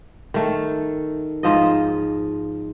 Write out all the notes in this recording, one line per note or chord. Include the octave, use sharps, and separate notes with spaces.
D#3 A3
G#2 F3 D#5